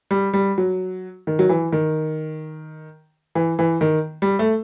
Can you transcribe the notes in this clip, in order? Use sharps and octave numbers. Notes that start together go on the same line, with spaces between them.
G3
G3
F#3
D#3
F#3
E3
D#3
E3
E3
D#3
G3
A3